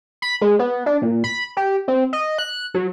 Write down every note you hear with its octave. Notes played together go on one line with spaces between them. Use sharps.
B5
G#3
B3
D4
A#2
B5
G4
C4
D#5
F#6
F#3